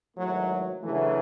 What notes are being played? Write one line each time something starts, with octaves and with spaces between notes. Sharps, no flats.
G#1 G#2 E3 F#3 A3
D2 C#3 E3 F#3 A3